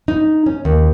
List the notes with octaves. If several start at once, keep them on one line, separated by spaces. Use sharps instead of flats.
D#4
C#4
D#2